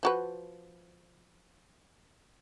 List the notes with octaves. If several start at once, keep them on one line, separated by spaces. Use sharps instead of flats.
F3 F#4 B4